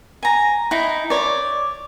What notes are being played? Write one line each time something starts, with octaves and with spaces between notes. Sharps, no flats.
G#5 A#5
D#4 E4
C#5 D5